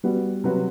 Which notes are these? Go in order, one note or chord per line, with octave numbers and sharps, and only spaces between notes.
G3 B3 F#4 B4
C3 F#3 C4 F#4 B4